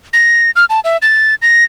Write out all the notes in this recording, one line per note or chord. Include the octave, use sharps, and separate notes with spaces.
A#6
F6
A5
E5
A6
A#6